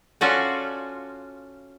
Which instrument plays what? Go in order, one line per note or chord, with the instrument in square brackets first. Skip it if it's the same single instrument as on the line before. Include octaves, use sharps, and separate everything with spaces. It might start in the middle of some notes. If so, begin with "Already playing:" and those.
[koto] C#4 F4 F#4 A4 D5 G#5